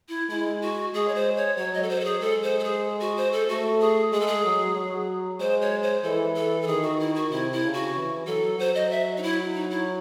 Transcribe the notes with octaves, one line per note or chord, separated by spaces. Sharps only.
E4
G#3 E4
F#4
G#3 G#4
C#5
C5
C#5
F#3 C#5
D#5
A4
C5
A4
G#4
G#3 A4
C5
A4
G#4
F#4
C5
A4
A3 F#4
G#4
G#3 G#4
A4
G#4
F#3
F#3
G#3 C5
C#5
C5
E3 A4
A4
A4
D#3 G#4
F#4
E4
F#4
C3 E4
E4
C#3
F#4
E3
F#3 A4
F#3 C5
D#5
E5
D#4
E4
D#4
E4